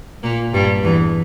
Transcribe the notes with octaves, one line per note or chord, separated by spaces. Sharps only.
A#2 A#3
G2 G3
E2 E3